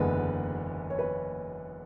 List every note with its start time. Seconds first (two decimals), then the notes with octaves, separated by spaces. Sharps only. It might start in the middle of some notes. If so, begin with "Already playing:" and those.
Already playing: F#1 E2 D3 G#3 B3 B4
0.90 C#5
0.99 B4